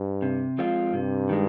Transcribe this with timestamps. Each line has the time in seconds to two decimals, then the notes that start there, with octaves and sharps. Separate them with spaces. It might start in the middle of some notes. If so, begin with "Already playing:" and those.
Already playing: G2
0.22 C3
0.58 F3 G#3 C4 F4
0.93 G2 C3
1.29 D#3 G#3